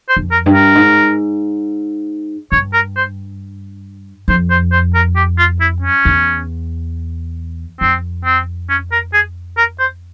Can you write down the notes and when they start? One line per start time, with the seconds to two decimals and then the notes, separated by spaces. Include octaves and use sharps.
0.09 C5
0.17 F2
0.31 A#4
0.46 G2
0.53 A#4
0.75 G#2
2.52 G2 C#5
2.73 A#4
2.96 C5
4.28 F2 C5
4.50 C5
4.72 C5
4.95 A#4
5.16 G4
5.38 F4
5.60 E4
5.82 C#4
6.05 E2
7.80 F2 C4
8.25 C4
8.69 C#4
8.92 A#4
9.14 G#4
9.57 A#4
9.79 C5